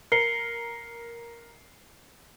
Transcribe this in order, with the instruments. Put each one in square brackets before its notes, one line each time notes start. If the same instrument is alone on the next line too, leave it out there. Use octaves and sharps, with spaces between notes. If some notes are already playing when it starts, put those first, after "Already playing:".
[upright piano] A#4 [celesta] C7 C#7 G7